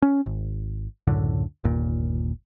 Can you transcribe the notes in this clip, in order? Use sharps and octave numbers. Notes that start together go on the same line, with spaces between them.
C#4
G#1
C#2 F#2 A2 D3
G1 D#2 A#2